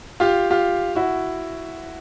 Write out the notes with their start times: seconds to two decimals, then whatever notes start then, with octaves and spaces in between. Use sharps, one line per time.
0.20 F4 G4
0.50 F4 G4
0.95 E4 F#4